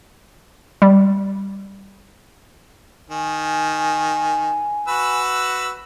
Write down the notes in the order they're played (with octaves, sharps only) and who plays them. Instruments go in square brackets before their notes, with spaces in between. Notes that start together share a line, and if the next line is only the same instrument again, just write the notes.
[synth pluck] G3
[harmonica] D#3 [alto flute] G#5
[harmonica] F#4 B4 E6